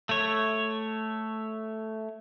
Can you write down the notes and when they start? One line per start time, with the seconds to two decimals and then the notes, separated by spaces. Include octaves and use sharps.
0.09 A3 C#5